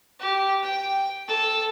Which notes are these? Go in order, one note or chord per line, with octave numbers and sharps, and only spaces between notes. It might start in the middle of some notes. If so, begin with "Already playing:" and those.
G4
G5
A4